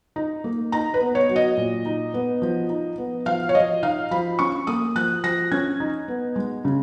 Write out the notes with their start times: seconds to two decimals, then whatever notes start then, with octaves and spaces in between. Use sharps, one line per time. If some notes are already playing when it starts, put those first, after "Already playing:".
0.16 D#4
0.44 A#3
0.72 D#4 A#5
0.94 B4
1.01 B3
1.15 C#5
1.29 F#3
1.36 D#5
1.57 A#2
1.86 D#4
2.14 B3
2.42 F3
2.70 D#4
2.98 B3
3.26 F3 F5
3.49 C#5
3.55 F3 D#5
3.83 D#4 F5
4.11 F3 B5
4.39 C#4 C#6
4.67 A#3 D#6
4.96 F3 F#6
5.24 F3 A#6
5.52 C#4 G#6
5.80 D#4
6.08 B3
6.36 G#3
6.65 C#3